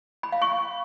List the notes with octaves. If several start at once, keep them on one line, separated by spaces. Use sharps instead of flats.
B5
F5
C#6